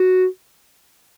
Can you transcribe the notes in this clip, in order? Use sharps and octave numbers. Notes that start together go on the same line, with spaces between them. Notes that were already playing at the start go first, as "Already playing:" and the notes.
Already playing: F#4